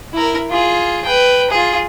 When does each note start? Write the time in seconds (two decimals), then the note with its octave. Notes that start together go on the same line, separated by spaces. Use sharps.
0.14 E4 A#4
0.51 F4 G#4
1.05 B4 G5
1.51 F4 G#4